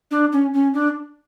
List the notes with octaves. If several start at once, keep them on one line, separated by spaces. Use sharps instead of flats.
D4
C#4
C#4
D4